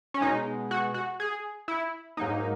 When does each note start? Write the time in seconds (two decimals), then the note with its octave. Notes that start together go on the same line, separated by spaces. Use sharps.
0.14 C#4
0.21 B2 G#3 D#4
0.71 F#4
0.94 F#4
1.20 G#4
1.68 E4
2.17 G#2 F#3 A#3 D#4